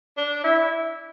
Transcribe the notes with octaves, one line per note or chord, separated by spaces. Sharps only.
D4
E4